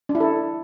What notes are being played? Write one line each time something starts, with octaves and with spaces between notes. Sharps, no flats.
D4
E4
A4